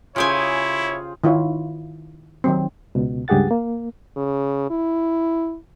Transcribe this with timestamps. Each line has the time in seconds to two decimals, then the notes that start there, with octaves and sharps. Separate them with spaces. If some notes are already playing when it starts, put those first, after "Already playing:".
0.16 C#3 E4 F4 G4 G#4 C5 C#5 G#5
1.24 D#3 E4 F4 C#5
2.44 D#3 F#3 C4
2.95 C#2 B2
3.28 C#2 G2 G4 G#4 F#5 A6
3.51 A#3
4.17 C#3
4.70 E4